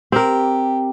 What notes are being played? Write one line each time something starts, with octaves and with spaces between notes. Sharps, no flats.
C4 G4 A#4